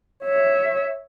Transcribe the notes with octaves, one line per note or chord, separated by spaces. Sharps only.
C#5 E5